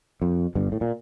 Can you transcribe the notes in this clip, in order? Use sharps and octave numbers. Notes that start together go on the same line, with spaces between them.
F2
G1 G2
A2
A#2